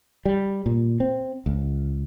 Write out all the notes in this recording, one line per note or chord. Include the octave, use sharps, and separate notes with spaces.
G3
A#2
C4
C#2